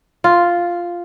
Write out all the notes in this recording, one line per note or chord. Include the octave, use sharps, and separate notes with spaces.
F4